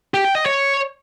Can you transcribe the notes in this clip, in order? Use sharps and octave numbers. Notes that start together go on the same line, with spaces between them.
G4
G5
D#5
C#5